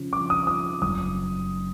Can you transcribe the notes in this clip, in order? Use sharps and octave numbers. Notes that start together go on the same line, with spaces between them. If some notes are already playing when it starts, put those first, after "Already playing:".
Already playing: C#3 F3
F3 D6
D#6
F3 D#6
F#1 D#6